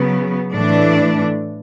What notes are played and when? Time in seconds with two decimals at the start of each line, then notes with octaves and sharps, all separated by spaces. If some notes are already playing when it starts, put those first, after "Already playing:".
Already playing: C#3 F#3 B3
0.52 A2 E3 A3 D4